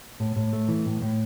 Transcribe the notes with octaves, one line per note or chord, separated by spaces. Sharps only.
A2
A2
A3
E3
A2
A2